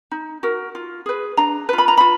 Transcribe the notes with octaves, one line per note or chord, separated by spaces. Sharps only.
D#4
F#4 A#4
F4
G#4 B4
D4 A#5
F4 B4
B5
A#5
F4 B5